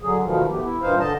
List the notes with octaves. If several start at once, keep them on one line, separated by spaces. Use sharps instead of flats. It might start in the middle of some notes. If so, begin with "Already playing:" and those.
D3 F#3 G#4
D2 B2 D#3 F3
A3 B3 G4
E4
G2 A#2 E3 D#4 C5 F5
D3 D#5 A5